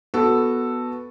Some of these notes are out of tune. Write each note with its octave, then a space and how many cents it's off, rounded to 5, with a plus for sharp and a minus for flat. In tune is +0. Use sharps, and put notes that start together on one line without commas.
B3 +0 F#4 -5 A4 +0